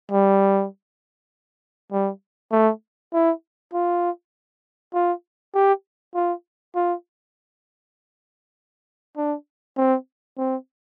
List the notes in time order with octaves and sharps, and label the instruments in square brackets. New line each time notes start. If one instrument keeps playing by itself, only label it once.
[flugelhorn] G3
G3
A3
E4
F4
F4
G4
F4
F4
D4
C4
C4